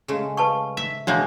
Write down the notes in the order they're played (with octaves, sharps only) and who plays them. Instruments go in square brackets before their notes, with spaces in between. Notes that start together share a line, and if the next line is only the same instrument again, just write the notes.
[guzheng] C#3 G#3 A3
[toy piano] B4 A5 C#6 [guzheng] F5
[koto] E5
[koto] B2 G#3 A#3 [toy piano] D4 C#5